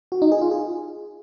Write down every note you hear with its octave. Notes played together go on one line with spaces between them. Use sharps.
F#4
D#4
G#4
F4
G#4